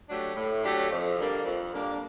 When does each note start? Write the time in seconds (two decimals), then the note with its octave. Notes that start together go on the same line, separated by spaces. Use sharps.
0.08 F#3 A3 D4 G4
0.36 A2
0.63 F#3 A3 D4 G4
0.90 F2
1.17 D3 G3 A#3 D4
1.44 F2
1.71 D3 G3 A#3 D4